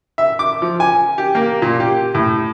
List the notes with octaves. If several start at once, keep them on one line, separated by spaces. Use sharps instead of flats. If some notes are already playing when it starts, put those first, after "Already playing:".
E5
D6
F3
G#5
G4
A#3
A#2
G4
A2